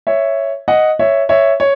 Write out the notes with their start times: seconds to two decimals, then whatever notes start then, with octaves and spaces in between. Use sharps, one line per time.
0.07 C#5 E5
0.68 D#5 F#5
0.99 C#5 E5
1.29 C#5 E5
1.60 C#5